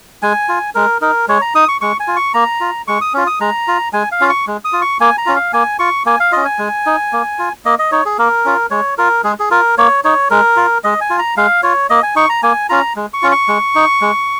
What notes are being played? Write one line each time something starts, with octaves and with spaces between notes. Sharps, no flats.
G#3 G#5
F4
G#3 A#4
D#4 A#4
G#3 C#5
A#5
D#4 D#6
C#6
G#3 C#6
G#5
F4
C#6
A#3 A#5
F4
G#3 C#6
D#6
C#4 F4
D#6
G#3 A#5
F4
G#3 G#5
F5
C#4 F4
C#6
G#3
D#6
F4
C#6
A#3 G#5
A#5
C#4 F4
F5
A#3 G#5
F4 C#6
A#3 G#5
F5
C#4 F4 D#5
G#5
G#3
D#4
A#3
F4
A#3 D#5
D#5
D#4 C#5
G#4
A#3 A#4
C#4 F4
G#3 C#5
F4 A#4
G#3 G#4
G#4
F4 A#4
A#3 C#5
D#4 C#5
G#3 A#4
F4
G#3 D#5
G#5
F4
A#5
G#3 F5
F4 C#5
A#3 D#5
G#5
D#4 C#6
A#5
A#3 G#5
C#4 F4 A#5
G#3
C#6
C#4 F4
C#6
G#3
D#4
G#3